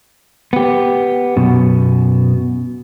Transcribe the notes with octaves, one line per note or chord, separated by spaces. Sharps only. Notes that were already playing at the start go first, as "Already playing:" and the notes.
B3 G4
F#2 B2